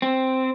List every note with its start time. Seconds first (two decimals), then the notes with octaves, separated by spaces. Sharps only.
0.02 C4